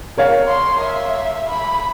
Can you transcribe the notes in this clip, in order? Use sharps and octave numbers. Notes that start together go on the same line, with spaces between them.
A#4 C#5 F5
C6
E5
B5